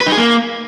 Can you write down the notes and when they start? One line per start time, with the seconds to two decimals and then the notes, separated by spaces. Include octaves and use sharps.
0.01 B4
0.06 D#4
0.12 G#4
0.17 A#3